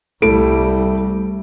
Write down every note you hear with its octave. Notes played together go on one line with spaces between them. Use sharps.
C2 G3 A3 E4 D7